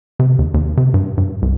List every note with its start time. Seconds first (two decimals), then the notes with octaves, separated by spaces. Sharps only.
0.19 C3
0.39 D#2
0.54 D#2
0.77 C3
0.94 G2
1.17 G2
1.42 C2